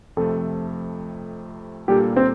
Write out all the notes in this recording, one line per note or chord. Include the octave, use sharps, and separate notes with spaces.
F2 C3 F3 A3 A4
A#2 G3 A#3 D4 G4 A4
C4